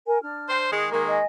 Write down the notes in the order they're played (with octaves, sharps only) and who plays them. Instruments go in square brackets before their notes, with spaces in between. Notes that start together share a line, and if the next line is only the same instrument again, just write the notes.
[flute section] A#4 G#5
D4 F6
[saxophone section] C5
D#3 G#3
[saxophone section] D#3 G#3 A#3 [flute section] A#4
[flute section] D#5 G#5